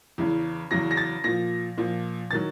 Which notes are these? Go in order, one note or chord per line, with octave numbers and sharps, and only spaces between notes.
E2 C#3 E3
E2 C#3 F#3 A#6
A#6
A6
A#2 F3 A#6
A#2 F3
D#3 F#3 A6